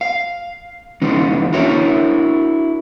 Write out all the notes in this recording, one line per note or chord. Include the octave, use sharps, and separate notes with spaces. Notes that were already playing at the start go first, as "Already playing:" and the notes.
F5
E3 G#3 C#4 D#4
D4 E4 F#4 A#4 C#5 E5